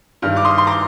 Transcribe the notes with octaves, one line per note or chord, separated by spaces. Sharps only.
G2 D#3 F6
D6 F6
C6 D#6
C6
A#5 D6